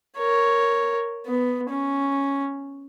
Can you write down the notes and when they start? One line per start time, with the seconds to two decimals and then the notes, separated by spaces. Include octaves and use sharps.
0.18 A#4 C#5
1.27 B3
1.70 C#4